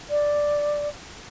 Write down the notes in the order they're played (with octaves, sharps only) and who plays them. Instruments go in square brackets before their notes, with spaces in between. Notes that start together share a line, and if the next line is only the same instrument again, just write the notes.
[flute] D5